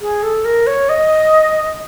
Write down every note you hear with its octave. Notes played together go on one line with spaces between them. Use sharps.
G#4
A4
A#4
C#5
D#5